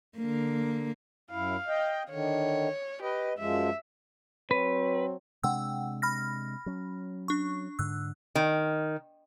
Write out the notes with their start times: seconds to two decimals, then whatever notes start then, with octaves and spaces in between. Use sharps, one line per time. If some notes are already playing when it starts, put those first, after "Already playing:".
0.18 D3 A#3
1.31 F#2 E4 F5
1.67 D#5 G5
2.10 D3 D#3 C#5
3.02 G4 B4 D#5
3.38 F#2 F3 G#3 E5
4.51 F#3 C4 B4 C#5
5.44 C3 G#3 D4 F#5 G5 E6
6.02 B5 F6 A#6
6.66 F#3 C#4
7.28 D4 C#6
7.79 G#2 D3 E6 F#6
8.35 D#3